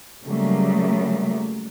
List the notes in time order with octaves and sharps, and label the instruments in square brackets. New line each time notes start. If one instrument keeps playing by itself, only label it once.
[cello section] C#3 F#3 G3 A3 A#3